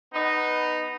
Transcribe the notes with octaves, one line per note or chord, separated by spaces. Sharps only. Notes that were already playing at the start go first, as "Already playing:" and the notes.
B3 D#4